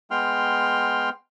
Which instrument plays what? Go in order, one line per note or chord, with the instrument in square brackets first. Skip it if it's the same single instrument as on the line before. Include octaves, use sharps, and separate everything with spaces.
[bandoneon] G#3 B3 G5 C6 F6